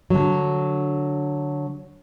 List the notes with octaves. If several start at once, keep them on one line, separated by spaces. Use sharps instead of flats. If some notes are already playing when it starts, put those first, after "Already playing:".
D3 F#3